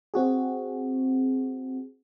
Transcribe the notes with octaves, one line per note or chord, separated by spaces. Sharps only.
C4 F#4 G#4